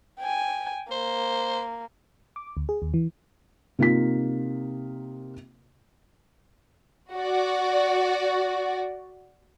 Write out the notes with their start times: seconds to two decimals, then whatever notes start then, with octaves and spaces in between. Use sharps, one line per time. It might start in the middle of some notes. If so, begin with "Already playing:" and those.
0.20 G5 G#5
0.91 A#3 C5
2.36 D6
2.57 D2
2.69 G#4
2.82 D#2
2.94 E3
3.79 C3 A#3 D#4 F4 B6
7.13 F#4 D5